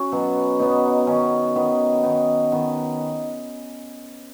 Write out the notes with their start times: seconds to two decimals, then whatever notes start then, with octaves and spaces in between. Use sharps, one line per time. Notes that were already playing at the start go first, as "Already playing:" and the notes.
Already playing: C#4 F#4 G#5
0.12 B2 F#3 B3
0.59 B2 F#3 B3 D#4
1.07 D#3 B3 C#4
1.55 D#3 B3
2.03 D#3 B3 D#4
2.52 D#3 B3